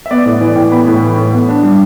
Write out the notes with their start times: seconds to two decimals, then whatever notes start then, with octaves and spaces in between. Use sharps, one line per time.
0.06 E5
0.11 B3 D5
0.25 A2 D5
0.41 E3 D5
0.56 A2 G5
0.71 B3 B5
0.87 A2
1.02 E3
1.18 A2
1.33 B3
1.49 D4
1.63 G3